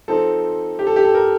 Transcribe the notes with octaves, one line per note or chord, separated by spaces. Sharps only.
F3 C4 D#4 A4
G4
A4
G4
A4
A#4